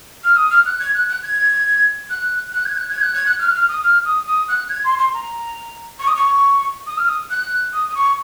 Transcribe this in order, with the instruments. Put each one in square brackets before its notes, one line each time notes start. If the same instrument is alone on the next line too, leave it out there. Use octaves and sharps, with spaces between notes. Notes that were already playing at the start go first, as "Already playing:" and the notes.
[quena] F6
D#6
F6
F#6
G#6
F#6
F#6
G#6
F#6
F#6
G#6
F#6
G#6
F#6
G#6
F#6
F6
F#6
F6
D#6
F6
D#6
D#6
F#6
G#6
C6
C6
A#5
C#6
D#6
C#6
D#6
F6
D#6
F#6
D#6
D#6
C#6